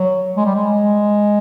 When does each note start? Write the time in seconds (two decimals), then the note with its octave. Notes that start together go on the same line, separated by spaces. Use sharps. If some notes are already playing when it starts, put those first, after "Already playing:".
Already playing: F#3
0.37 G#3
0.46 G3
0.55 G#3